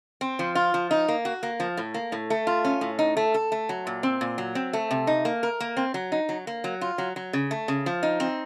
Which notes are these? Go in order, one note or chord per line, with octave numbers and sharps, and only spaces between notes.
C4
F3
F4
F3
D#4
A#3
F#4
A#3
F3
A2
A#3
A2
A3
F4
C#4
A2
D#4
A3
A4
A3
F#3
A#2
C4
A#2
F#3
C4
A3
C3
D#4
A#3
A#4
A#3
C4
F#3
D#4
F#3
A#3
F#3
F4
F#3
F#3
C#3
A3
C#3
F3
D#4
C4